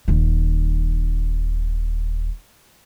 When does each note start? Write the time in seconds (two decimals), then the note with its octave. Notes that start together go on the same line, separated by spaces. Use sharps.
0.08 D#1 D#3